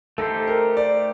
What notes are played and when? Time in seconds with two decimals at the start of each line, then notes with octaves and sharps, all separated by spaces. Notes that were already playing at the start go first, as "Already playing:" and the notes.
0.18 A3 D#4 G4 A4 C5
0.47 A#4
0.77 D5